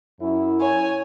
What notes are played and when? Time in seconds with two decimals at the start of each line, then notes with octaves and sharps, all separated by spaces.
0.21 F#2 E4
0.61 C#5 G#5